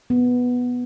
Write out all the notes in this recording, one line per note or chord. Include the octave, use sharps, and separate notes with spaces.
B3